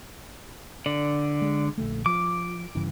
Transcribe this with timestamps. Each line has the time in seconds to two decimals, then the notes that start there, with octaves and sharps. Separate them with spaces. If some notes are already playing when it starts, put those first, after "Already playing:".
0.86 D3 D5
1.41 G#3
1.78 A#1 D3 A3
2.06 F3 D6
2.75 G2 C#3 E3